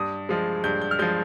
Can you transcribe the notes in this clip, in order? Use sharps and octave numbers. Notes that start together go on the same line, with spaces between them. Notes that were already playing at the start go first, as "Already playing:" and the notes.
Already playing: G2 D#6
F3 G#3
G2 G6
G6
F6
F3 G#3 G6